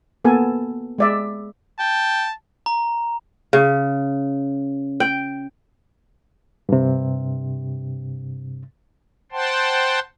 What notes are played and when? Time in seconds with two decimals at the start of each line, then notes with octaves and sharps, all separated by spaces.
0.25 A#3 B3 A4 G#5
0.99 G#3 D5 E5
1.79 G5 A5
2.66 A#5
3.53 C#3
5.00 G5
6.69 G2 C3
9.32 C5 F#5 G5 A5 C6